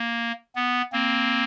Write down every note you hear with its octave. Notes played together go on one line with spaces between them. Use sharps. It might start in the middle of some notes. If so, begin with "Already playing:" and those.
Already playing: A#3
B3
A#3 C4